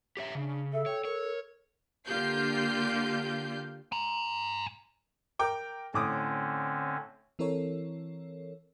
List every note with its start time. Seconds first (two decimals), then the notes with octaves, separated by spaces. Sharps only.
0.17 G4 C#5 E5
0.35 C#3 D4
0.73 A4 E5
0.86 C#5 G5
1.05 A#4 C#5
2.06 D3 A#3 F4 G4 G6 C7
3.92 G#5 A#5
5.39 A#4 G5 D6
5.94 A2 D3 C4 C#4 D6 D#6
7.39 E3 C4 E4 A4 A#4 C#5